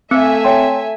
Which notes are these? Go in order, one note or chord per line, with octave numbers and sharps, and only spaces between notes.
A3 C4 E5 G#5 E6
C#5 G5 C6